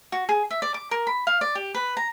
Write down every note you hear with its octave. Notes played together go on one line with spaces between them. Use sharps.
F#4
G#4
E5
D5
D6
A#4
B5
F5
D5
G4
B4
A#5